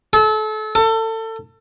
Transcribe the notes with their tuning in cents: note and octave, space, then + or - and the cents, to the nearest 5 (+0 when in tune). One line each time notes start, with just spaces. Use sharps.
A4 -30
A4 +30